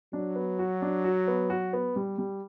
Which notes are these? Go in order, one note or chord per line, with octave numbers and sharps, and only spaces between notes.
F#3 D4
B3
F#4
D4
F#4
B3
F#4
B3
G3
G3